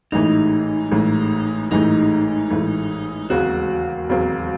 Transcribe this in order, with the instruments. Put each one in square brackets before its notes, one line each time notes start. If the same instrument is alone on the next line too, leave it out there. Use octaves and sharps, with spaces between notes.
[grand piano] A1 G#2 E3 A3 [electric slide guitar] D#4
[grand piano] A1 G#2 E3 A3
[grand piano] A1 G#2 E3 A3 [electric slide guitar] D#4
[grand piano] A1 G#2 E3 A3
[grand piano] E1 D#2 C#3 F#3 C4 [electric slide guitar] F#4
[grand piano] E1 D#2 C#3 F#3 C4